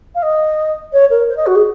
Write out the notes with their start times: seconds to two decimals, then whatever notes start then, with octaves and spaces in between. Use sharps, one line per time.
0.15 F5
0.22 D#5
0.92 C#5
1.10 A#4
1.29 C5
1.36 D#5
1.46 F#4
1.55 G#4